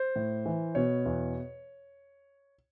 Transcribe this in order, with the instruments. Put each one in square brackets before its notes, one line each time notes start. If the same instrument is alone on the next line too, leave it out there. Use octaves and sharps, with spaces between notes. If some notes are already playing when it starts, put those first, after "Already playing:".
Already playing: [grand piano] C5
A2
E3
B2 C#5
E2